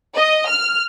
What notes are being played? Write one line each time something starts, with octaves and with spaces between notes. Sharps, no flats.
D#5
F6